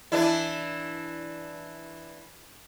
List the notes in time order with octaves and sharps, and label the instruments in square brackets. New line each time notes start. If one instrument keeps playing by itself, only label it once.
[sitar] E3 D4 E4